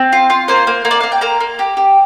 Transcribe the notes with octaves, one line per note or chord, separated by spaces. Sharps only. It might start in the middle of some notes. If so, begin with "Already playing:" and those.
Already playing: C4
F4
F4
A#3 C5
A#3
A#3
D5
A#3 F5
G5
A#3 A#5
A#3
G4
G4